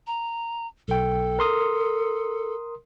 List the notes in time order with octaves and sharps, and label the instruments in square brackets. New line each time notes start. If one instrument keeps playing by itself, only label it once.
[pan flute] A#5
[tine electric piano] B1 G5 [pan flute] A4
[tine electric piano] A#4 C6 D#6